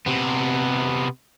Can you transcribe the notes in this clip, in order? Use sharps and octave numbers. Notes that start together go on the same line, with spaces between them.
C3 B3